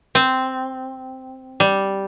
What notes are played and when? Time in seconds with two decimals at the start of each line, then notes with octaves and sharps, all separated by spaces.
0.15 C4
1.60 G3